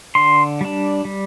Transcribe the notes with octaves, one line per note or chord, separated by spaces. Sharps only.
D3 C6
G3 D4
G3